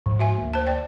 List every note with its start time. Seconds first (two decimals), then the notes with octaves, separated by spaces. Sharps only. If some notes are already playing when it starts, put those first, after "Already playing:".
0.06 G#2 F3
0.19 F#4 E5 G#5
0.38 D2 A#3
0.53 C5 A5
0.67 D5 G5